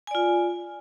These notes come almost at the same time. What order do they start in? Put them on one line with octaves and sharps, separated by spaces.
G#5 D5 F4